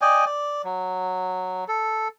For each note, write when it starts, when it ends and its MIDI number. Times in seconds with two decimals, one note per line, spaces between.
0.01 0.25 74
0.01 0.25 75
0.01 0.25 79
0.01 0.25 80
0.26 0.62 74
0.64 1.64 54
1.68 2.08 69